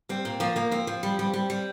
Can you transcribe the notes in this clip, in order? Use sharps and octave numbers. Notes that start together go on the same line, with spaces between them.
G3 C4
A#2
F3 A#3
F3 A#3
F3 C4
F3
G3
G3
G3
G3